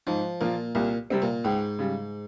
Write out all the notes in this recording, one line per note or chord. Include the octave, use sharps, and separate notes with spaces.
G#2 F3
A#2 F3 A#3 F4
C2 A#2
C3 G3 C4
A#2
C#2 G#2
C#3 G3